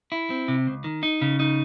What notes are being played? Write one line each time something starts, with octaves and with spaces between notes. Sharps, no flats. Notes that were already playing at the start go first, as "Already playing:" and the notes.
E4
C4
C3
C#2
D#3
D#4
C#3
D#4